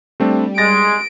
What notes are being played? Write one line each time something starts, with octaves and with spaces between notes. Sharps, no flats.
G3 A3 C4 D4
G#3 A6 A#6 D7